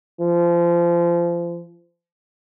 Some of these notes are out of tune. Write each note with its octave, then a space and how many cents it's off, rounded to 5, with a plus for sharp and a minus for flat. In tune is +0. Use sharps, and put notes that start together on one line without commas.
F3 -25